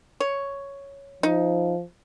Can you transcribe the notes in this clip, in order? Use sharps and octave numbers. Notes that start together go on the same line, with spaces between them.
C#5
F3 D#4